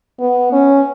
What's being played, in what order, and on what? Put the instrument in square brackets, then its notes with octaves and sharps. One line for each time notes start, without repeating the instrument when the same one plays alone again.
[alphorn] B3
C#4